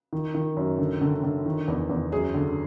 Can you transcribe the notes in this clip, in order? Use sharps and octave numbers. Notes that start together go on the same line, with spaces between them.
D#3
D#3
F#2
D3
D3
D3
D#3
E2
E2
F#2 G#4
D3